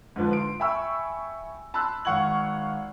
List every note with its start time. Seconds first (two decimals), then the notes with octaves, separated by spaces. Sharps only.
0.16 G#2 D3 F3 B4
0.33 C6 D7
0.60 E5 G5 G#5 B5 C#6 E6
1.74 A5 B5 C6 E6 F#6
2.05 G#1 F5 F#5 C#6 G#6 F#7